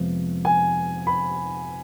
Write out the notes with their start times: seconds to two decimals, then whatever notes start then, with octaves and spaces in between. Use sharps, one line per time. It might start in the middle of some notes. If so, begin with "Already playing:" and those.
Already playing: F2 C3 F3 G#3 B3
0.45 G#5
1.07 B5